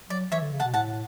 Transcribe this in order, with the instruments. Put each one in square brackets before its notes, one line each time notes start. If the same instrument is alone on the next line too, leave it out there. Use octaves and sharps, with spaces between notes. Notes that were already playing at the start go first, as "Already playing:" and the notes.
[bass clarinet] F#3 [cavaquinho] D5
[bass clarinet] E3 [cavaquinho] C#5 E5
[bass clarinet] D3
C#3
[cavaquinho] F#5 A5
[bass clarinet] B2
[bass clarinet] A2 [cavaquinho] F#5 A5